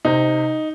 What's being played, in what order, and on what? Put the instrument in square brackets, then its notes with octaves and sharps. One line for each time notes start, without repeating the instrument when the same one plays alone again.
[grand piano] C3 D#4